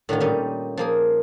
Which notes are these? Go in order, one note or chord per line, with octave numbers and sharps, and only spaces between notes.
A2 D3 D#3 F4
A#2 G3 C#4 D#4
F3 A#3 G#4